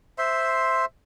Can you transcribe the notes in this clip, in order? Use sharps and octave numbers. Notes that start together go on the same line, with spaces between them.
C5 E5 C6